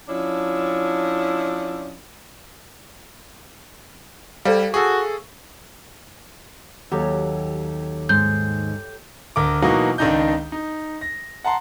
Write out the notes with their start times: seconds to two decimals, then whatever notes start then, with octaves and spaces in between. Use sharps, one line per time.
0.08 F3 C#4 D4 E4
4.45 G3 A4 C5 F5
4.74 F#4 G#4 A4 C#6
6.92 D#2 F#3 G4 A4 C#5
8.09 G#2 G6
9.36 D2 A#4 D6
9.62 B2 E3 F#3 A#3 D#4 F#4
9.98 C#2 D#3 D4 D#4 D#5 G6
10.52 D#4
11.01 A#6
11.44 F#5 A5 A#5 C6